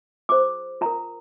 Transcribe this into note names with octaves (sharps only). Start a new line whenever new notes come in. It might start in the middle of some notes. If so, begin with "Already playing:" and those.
F4 G#4 C5 D6
F4 A#4 A#5